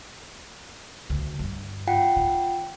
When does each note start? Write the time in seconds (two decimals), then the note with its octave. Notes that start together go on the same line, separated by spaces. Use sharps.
1.10 D2
1.39 D2 G2
1.87 F4 F#5 G5
2.16 D#3